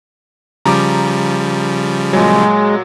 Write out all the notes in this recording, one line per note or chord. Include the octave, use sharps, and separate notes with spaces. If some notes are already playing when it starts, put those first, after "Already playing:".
C#3 F3 G3 A#5 D6
A#2 F#3 G#3